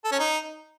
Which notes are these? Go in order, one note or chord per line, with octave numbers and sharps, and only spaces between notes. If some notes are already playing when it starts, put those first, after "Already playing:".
A4
C#4
D#4